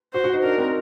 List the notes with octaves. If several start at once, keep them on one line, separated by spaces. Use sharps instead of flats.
F#4 C5
F#4
D#4
D4 A#4
C4